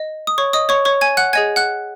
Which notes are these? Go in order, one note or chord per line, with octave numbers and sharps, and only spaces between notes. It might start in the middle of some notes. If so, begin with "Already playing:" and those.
Already playing: D#5
D#6
C#5 C#6
D#5 D#6
C#5 C#6
C#5 C#6
G#5 G#6
F#5 F#6
G#4 D#5 F#5 G#5 G#6
F#5 F#6